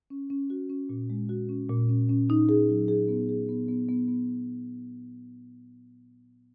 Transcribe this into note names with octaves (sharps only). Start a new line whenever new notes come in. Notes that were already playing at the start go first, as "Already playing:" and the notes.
C#4
C#4
F#4
C#4
A#2
G#3
F#4
C#4
A#2
C#4
C#4
D#4
G#4
F#3
G#4
B3
G#4
B3
B3
B3
B3